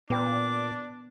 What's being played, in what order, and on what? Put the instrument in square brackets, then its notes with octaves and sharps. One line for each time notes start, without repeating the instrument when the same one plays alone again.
[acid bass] A#2 [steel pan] B3 B4 G5 [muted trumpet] D4 [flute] D6